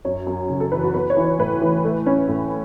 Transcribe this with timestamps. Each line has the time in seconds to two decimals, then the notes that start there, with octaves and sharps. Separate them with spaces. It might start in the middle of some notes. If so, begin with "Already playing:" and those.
0.05 F#2 C#5
0.27 F#2
0.49 C#3
0.60 A4
0.72 E3 B4
0.84 F#4
0.94 B3 B4
1.10 C#5
1.17 E3
1.24 C#5
1.39 A2 B4
1.61 E3
1.85 A3
2.06 C#4
2.28 A2